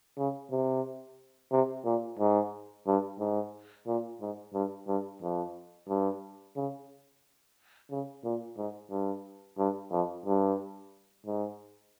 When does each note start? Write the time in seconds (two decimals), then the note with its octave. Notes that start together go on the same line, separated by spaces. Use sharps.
0.18 C#3
0.51 C3
1.52 C3
1.85 A#2
2.19 G#2
2.87 G2
3.20 G#2
3.87 A#2
4.21 G#2
4.54 G2
4.87 G2
5.22 F2
5.89 G2
6.56 C#3
7.90 C#3
8.24 A#2
8.57 G#2
8.91 G2
9.58 G2
9.91 F2
10.26 G2
11.26 G#2